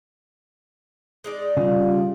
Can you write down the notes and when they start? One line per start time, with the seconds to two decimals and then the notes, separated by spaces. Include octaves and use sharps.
1.24 G#3 D#4 D5
1.57 C#3 G3 F4